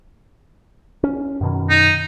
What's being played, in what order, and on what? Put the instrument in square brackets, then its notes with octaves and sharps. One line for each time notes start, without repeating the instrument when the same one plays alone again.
[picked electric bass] C#4
F#2 B2 D#3
[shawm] D#4